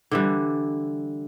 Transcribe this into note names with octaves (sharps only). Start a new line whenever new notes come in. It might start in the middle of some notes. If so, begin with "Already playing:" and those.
D3 E3 G3